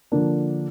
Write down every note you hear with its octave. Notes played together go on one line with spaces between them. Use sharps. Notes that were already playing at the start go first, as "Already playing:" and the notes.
D3 F3 A#3 D4